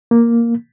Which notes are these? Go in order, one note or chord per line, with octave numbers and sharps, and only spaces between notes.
A#3